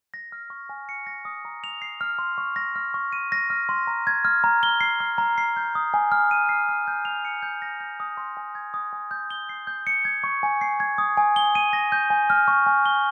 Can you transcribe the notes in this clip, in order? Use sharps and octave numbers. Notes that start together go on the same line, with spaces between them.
A#6
F6
C#6
G#5
C#7
A#6
D#6
A#5
F7
C7
F6
C6
C#6
A#6
F6
C#6
D#7
A#6
F6
C6
A#5
G#6
F6
A#5
G7
C7
F6
A#5
C7
G6
D#6
G#5
F6
D#7
C7
F6
G6
F7
C#7
G6
A#6
G6
D#6
C6
G#5
G#6
D#6
G#5
G6
G7
C7
G6
C#7
G#6
C#6
G#5
C7
G#6
D#6
G#5
G7
D#7
A#6
G6
G#5
F6
C#6
G#5
G7